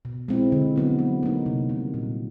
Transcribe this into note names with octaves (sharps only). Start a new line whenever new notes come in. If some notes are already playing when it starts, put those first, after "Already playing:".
B2
G#3 C4 E4
D3
F#3 B3 E4
F#3
A#3 D#4
C3
D#3 G3 A#3
A#2